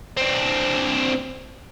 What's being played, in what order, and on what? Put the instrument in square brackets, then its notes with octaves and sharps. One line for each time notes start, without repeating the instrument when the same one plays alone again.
[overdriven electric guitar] C4 D4